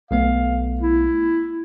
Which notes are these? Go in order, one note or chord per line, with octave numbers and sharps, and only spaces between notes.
B1 A3 B3 F5
E4